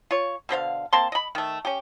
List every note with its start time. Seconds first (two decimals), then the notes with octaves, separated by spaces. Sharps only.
0.11 F4 C#5
0.49 B2 D3 C5 F5
0.93 A#3 C4 A5 C6
1.12 D#5 B5
1.35 D#3 A3
1.65 C#4 G4